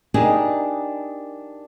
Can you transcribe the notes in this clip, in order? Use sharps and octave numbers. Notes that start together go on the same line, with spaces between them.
D4 D#4 G4 G#4 A#4 D#5